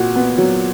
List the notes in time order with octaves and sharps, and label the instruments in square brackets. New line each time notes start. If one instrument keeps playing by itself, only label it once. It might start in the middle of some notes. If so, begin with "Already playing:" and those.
Already playing: [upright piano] A#2 F#4
B3
F#3